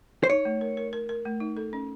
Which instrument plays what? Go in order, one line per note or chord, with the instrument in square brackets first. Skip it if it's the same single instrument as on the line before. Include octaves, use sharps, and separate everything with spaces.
[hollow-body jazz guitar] C5
[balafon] D#4 [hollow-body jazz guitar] C#5
[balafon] A3
A#4
A#4
A#4
A#4
A3
D#4
A4
C#4